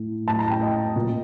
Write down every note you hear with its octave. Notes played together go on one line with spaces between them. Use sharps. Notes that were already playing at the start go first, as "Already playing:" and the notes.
Already playing: A2
A2 A5
A#5
G5
D#5
A#2